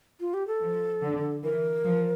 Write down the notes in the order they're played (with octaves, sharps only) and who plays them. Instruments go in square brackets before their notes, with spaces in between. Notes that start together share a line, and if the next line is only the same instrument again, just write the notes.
[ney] F4
G4
A4
[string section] F3
D3
[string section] E3 [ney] A#4
[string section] F3